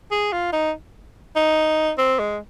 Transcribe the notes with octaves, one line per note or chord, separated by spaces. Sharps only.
G#4
F4
D#4
D#4
C4
G#3